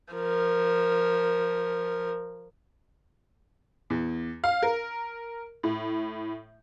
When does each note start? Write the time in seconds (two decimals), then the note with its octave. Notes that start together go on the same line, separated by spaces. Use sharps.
0.13 F3 A#4
3.90 E2
4.44 F5
4.63 A#4
5.63 A2